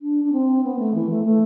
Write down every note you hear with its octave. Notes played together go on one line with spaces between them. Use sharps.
D4
D4
C4
B3
A3
E3
A3
A3